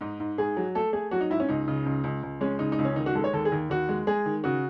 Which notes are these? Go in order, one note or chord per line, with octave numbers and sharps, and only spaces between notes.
G#2 D#4
G#2
G#2 G#4
F#3
A3 A4
A3 G#4
F#3 F#4
D#4
G#2 E4
C#4
C#2 D#4
C#3
C#2
C#2
C#2
G#3 C#4
C#3 D#4
D#4
C#2
C#4
D#3 D#4
F#4
G#3 A4
C#5
D#2 A4
G#4
D#2
D#2 F#4
G#3
G#3 G#4
D#3
C#3 F#4